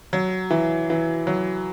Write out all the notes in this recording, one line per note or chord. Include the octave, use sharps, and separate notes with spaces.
F#3
E3
E3
F#3